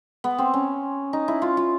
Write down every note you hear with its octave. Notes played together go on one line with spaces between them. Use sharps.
B3
C4
C#4
D#4
E4
F4
F4